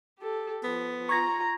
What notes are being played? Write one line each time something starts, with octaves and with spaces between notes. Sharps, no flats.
G4 A4
F3 B3
F4 A#5 C#6 G#6 A#6